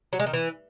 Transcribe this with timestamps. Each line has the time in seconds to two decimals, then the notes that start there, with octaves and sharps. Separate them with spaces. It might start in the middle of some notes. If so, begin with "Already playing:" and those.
0.13 F#3
0.20 G#3
0.27 D#3
0.34 E3